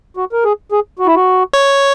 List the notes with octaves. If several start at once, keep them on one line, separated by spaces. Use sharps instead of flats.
F#4
A#4
G#4
G#4
F#4
E4
F#4
C#5